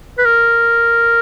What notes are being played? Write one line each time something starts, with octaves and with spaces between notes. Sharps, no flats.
B4
A#4